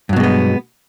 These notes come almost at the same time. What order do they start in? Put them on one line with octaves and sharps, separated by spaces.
G2 F#3 B2 G#3 B3